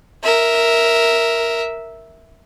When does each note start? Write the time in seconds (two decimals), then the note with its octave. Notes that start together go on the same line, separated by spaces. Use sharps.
0.23 A#4 E5